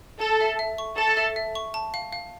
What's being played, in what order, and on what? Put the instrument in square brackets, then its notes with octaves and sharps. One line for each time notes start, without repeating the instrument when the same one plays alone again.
[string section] A4 [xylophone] A5
[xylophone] E5
E5
C#6
[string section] A4 [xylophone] A5
[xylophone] E5
E5
C#6
A5
F5
F5